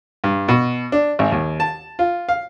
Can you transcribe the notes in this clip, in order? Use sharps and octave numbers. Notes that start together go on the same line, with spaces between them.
G2
B2
D4
G#1
D#2
A5
F4
F5